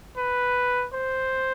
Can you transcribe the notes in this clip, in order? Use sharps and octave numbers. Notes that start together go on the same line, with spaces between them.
B4
C5